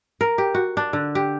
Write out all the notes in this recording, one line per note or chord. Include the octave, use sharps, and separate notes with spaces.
A#4
G4
F#4
D4
D3
G4